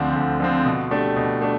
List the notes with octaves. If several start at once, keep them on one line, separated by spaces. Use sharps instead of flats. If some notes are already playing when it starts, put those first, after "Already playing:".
Already playing: D2 D3 F3 C4
D2
D3 F3 C4
B2
A3 D4 G4
B2
A3 D4